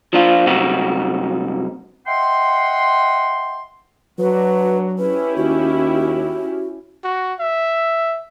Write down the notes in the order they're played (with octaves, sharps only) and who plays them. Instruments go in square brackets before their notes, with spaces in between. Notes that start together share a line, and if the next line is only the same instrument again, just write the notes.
[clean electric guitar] F3 D4 F4
C2 F#2 C3 D#4 F#4
[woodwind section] D#5 E5 F#5 G5 C6
[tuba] F#3 [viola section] D4 F#4 [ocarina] B4
[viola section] C#4 E4 G4 [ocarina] B4
[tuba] D#2 [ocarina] F#4
[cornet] F#4
E5